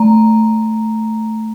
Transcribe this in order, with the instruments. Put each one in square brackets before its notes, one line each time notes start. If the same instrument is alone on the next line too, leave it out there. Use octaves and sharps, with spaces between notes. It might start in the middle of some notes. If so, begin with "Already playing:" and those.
Already playing: [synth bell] A3 A#5